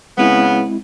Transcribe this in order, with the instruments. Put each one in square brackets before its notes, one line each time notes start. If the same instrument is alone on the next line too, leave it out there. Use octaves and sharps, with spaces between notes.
[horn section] C#3 B3 [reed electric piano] G#3 C4 E4